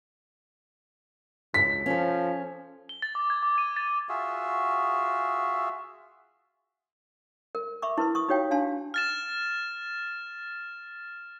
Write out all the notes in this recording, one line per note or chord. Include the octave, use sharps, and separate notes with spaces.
C#2 B6
F3 C#4 A4
G7
A6
D6
G#6
D6
D#7
A6
F4 F#4 G#4 E5
A#4
E5 B5 C#6 D6
E4 A#4 B4 C6
C#6 D#6
D#4 F#4 G4 C#5 F5 G5
D4 F5 G#5 A5 C6
F6 A6 E7